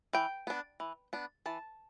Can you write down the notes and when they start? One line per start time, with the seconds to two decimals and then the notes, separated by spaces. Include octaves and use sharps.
0.13 E3 G5
0.47 B3 D4
0.80 E3
1.13 B3 D4
1.46 E3 A5